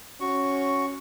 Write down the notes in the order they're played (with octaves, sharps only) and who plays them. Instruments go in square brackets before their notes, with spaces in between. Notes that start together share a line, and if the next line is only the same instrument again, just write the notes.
[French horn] C#4 [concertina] F#4 C#6